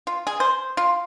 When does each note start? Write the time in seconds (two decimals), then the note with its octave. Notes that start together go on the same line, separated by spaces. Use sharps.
0.07 F4
0.27 G#4
0.40 C5
0.77 F4